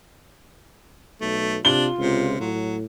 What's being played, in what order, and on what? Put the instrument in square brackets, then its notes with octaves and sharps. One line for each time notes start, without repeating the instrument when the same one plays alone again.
[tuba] B1 [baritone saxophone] A3
[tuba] C3 [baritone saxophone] D4 [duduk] F4 [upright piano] G7
[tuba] C#2 [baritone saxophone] C3
[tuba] A2 [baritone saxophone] F#3